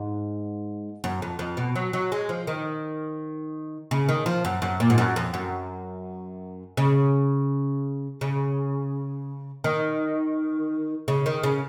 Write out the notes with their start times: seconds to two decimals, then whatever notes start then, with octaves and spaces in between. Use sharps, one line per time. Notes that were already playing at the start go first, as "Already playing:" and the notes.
Already playing: G#2
1.04 F#2
1.22 F2
1.39 F2
1.57 B2
1.76 F#3
1.93 F#3
2.12 G#3
2.29 F3
2.47 D#3
3.91 C#3
4.09 D#3
4.26 F3
4.45 F#2
4.62 F#2
4.80 A#2
4.90 G#2
4.98 F#2
5.16 F2
5.34 F#2
6.77 C#3
8.21 C#3
9.64 D#3
11.08 C#3
11.26 D#3
11.43 C#3